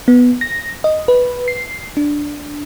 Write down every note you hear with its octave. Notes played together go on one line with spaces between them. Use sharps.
B3
A#6
D#5
B4
C7
D4